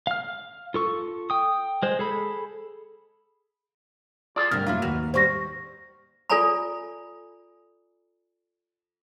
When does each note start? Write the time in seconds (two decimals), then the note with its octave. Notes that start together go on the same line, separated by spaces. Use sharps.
0.07 F5 F6
0.74 F4 A4 C#6
1.30 G5 D#6
1.83 G#3 C5
1.99 G#4 A4 B5
4.36 F4 G#4 A4 D5
4.51 D2 G#2 C3 G3 A#4
4.66 F#2 F#3 A#3 E4 F4
4.82 D#2 F#4 B4 F6
5.14 G3 B3 C4 C5 C#6 A#6
6.30 F4 A4 D5 G#5 A#5 B5